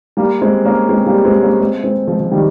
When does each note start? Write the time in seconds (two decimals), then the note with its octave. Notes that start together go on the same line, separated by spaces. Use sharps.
0.17 G3 A#3
0.41 G#3 C4
0.65 A#3 C#4
0.89 G#3 C4
1.07 G3 A#3
1.25 G#3 C4
1.42 A#3 C#4
1.61 G#3 C4
1.84 G#3 C4
2.08 F3 G#3
2.20 F3
2.32 D#3 G3